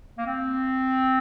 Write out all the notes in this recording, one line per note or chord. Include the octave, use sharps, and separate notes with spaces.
A#3
C4